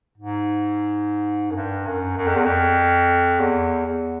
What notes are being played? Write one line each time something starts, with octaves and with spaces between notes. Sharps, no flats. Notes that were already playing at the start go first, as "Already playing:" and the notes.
G#2
F#2
G2
F#2
F#2
F2
E2
F2
E2
E2